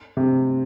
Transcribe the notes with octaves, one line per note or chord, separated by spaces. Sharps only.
C3